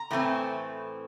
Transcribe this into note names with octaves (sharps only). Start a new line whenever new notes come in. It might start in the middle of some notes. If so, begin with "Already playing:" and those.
Already playing: A#5
A2 E3 A3 C4